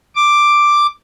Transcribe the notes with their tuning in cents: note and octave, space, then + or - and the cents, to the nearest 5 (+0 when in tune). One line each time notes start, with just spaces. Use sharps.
D6 +5